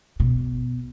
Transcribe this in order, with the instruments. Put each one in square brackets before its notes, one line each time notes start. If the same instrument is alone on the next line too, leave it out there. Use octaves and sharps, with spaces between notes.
[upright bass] B2